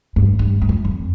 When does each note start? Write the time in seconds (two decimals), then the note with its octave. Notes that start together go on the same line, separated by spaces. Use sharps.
0.16 G2
0.39 G2
0.62 G2
0.69 F2
0.85 F2